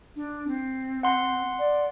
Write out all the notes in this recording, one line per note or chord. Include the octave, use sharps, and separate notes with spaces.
D4
C4
F#5 C6
D5